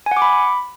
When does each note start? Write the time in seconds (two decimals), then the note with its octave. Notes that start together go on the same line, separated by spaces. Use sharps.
0.06 G#5
0.11 F#5
0.17 D6
0.22 B5